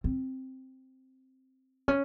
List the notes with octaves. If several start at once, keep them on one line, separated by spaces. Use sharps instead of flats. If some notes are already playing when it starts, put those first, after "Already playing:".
C4
C#4